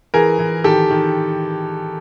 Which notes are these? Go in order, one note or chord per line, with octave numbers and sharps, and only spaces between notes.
E3 G#4 A#4
E3
D#3 G4 A4
D#3